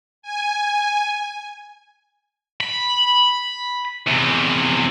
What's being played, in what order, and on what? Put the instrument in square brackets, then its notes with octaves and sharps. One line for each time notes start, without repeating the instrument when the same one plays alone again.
[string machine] G#5
[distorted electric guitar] B5
E2 C3